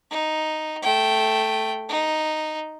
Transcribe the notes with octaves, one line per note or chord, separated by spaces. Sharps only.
D#4
A3 G5
D#4